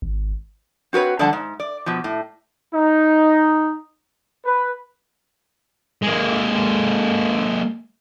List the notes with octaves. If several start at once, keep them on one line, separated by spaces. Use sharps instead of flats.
G#1
C4 F#4 A4 B4 C#5
D3 F3 G3 D5 F#5 A5
G#2
D5
B2 F3
A2
D#4
B4
G#3 A#3